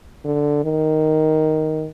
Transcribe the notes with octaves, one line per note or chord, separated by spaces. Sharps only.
D3
D#3